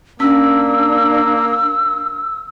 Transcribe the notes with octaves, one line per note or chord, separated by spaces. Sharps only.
A#3 C#4 D4 E6